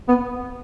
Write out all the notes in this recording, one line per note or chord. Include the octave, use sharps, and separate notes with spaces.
B3